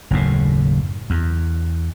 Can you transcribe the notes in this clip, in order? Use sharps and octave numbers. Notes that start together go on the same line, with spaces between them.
F#1 D#2 A2
E2